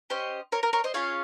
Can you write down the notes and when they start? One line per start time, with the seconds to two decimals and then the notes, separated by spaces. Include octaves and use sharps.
0.10 C#4 G4 C5 D#5
0.52 A#4 C#5
0.63 A#4
0.73 A#4 C#5
0.84 C5 D#5
0.94 C#4 F4 G#4 C#5 F5